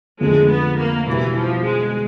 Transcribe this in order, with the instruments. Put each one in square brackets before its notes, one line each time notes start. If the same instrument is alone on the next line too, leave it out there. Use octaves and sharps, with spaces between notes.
[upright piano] F2 D3 F3 A3 C4 [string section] G#3
[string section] B3
A#3
[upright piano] B2 G3 B3 E4 [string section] E3
[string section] F3
G#3